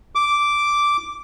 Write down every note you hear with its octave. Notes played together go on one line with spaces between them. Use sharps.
D6